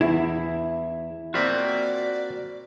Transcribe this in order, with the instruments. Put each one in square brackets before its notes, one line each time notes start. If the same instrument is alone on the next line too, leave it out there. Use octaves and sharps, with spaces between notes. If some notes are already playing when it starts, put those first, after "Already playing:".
[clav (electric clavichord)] E2 [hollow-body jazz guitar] E4
[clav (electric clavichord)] A#3 C4 F4 [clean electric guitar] F#4 B5 [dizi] D5